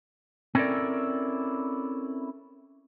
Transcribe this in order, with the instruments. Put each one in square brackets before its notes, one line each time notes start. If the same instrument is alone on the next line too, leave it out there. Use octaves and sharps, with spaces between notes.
[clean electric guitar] C4 C#4 E4 A4 A#4 D5